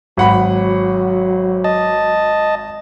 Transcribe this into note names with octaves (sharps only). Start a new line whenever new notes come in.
G#1 F#3 F#5 B5
D#5 A5